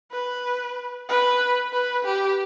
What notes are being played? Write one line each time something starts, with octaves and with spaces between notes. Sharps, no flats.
B4
B4
B4
G4